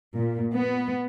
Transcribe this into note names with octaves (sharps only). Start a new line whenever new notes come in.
A#2
B3